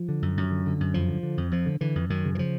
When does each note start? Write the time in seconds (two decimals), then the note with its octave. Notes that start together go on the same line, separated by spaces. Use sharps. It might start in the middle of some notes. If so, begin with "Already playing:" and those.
Already playing: F3
0.09 D3
0.22 F#2
0.37 F#2
0.51 D3
0.66 D3
0.80 F#2
0.94 F2 F3
1.08 D3
1.23 D3
1.37 F2
1.52 F2 F3
1.66 D3
1.81 D3 E3
1.96 F2
2.10 F#2 D#3
2.25 C#3
2.35 E3
2.38 C#3 F3